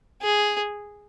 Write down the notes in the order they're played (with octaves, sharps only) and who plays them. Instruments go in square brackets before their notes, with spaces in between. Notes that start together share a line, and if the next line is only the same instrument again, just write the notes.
[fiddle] G#4